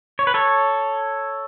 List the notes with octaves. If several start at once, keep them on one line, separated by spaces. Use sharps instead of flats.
C#5
B4
A4 C#5